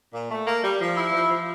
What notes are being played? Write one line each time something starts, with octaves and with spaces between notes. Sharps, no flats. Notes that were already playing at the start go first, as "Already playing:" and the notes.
A#2
A3
A#3
G3
F3
E4
F3
F3